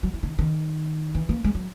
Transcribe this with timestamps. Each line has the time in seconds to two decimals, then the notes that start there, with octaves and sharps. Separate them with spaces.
0.03 F#3
0.14 E3
0.23 D#3
0.39 D#3
1.15 E3
1.29 A#3
1.44 G#3
1.55 F#3